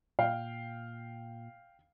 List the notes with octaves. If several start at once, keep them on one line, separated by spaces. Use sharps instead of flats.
A#2 F5 G5